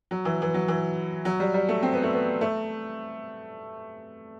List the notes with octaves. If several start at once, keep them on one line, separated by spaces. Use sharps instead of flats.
F#3
E3
E3
F#3
E3
F#3
G3
G3
A3
C4
B3
A3
B3
A3